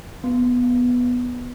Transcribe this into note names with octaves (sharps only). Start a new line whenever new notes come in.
B3